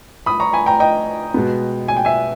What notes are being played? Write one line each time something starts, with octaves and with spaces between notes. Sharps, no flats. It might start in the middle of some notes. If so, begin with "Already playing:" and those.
B5 D#6
A#5 C#6
G#5 B5
G5 A#5
D#5 G5
B2 G#3 B3
G#5
G5
E5 G#5